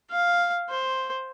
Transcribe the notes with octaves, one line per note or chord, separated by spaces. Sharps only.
F5
C5